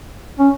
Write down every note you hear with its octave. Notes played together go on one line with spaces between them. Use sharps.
C#4